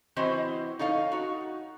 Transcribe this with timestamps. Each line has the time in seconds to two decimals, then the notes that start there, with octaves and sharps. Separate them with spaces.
0.16 E3 C4 E4 F#4 C5 D#5
0.79 D#4 A4 C#5 F5
1.12 D#4 F#4